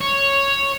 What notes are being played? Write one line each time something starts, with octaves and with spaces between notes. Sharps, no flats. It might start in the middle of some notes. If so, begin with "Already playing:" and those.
C#5